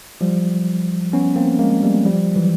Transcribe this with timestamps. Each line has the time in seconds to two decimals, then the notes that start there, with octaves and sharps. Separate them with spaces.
0.21 F3 G3
1.13 B3 C#4
1.36 A#3 C4
1.59 G#3 A#3
1.83 G3 A3
2.05 F3 G3
2.36 E3 F#3